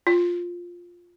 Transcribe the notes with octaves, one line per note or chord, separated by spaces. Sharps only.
F4